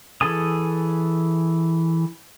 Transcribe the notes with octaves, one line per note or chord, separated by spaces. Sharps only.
E3 G#4 A4 G#5 D#6